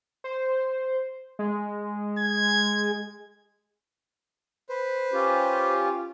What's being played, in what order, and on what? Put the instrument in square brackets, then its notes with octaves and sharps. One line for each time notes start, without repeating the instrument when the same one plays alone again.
[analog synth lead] C5
G#3
[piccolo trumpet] G#6
[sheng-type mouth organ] B4 C5
[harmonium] C#4 F4 G4